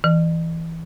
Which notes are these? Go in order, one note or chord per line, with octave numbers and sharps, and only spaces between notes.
E3